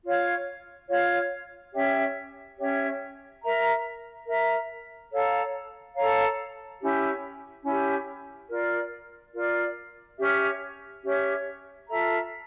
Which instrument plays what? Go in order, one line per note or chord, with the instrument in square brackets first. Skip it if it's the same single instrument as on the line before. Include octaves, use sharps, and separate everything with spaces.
[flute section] F4 C#5 F5
F4 C#5 F5
C#4 G4 C#5 E5
C#4 G4 C#5 E5
A#4 E5 A#5
A#4 E5 A#5
A4 C#5 F5 A#5
A4 C#5 F5 A#5
C#4 E4 G4
C#4 E4 G4
F4 A#4 D5
F4 A#4 D5
C#4 G4 C#5 E5
C#4 G4 C#5 E5
F4 A4 E5 A#5